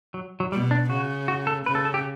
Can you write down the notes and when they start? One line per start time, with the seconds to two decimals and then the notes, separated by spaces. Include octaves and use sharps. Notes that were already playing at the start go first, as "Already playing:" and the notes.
0.14 F#3
0.40 F#3
0.52 B2 G3
0.71 D4
0.90 C#3 F#4
1.28 F#4
1.47 A4
1.66 C#3 B4
1.75 A4
1.85 A4
1.94 G4